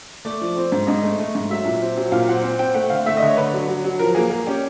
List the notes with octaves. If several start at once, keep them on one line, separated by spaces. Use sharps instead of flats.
A3 D5
F3
C4
G#2
G#2 D#5
A3
A3
G#2
F#3 E5
A#2
C4
F#3
A#2 F5
C4 F#5
C4
C4 G5
A3 F#5
D3 F5
A3 E5
D#5
D3
C#5
D3 B4
F#3
F#3
F#3
F3 A#4
A#3 G#4
A#3 G#4
C#4 G4